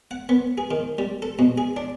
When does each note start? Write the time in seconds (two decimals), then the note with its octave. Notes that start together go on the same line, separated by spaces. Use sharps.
0.11 F#5
0.29 B3
0.58 G#4
0.71 D#3
0.98 G3
1.22 A4
1.39 B2
1.58 G#4
1.77 D4